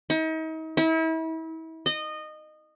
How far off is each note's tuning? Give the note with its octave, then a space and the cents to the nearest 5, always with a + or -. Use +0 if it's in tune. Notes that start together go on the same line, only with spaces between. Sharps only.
D#4 +40
E4 -35
D#5 -20